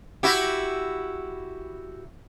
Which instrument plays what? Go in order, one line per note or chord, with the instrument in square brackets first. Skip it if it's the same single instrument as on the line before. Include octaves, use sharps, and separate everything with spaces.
[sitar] E4 F#4 G4